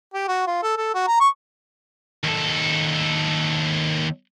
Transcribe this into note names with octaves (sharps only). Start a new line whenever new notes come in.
G4
F#4
F4
A4
A4
F#4
A#5
C#6
D#2 A4